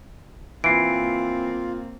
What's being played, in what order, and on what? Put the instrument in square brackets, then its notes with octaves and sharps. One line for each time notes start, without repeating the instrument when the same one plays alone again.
[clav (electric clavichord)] E3 [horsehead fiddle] A#3 C4 [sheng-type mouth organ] F4 [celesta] C7 D7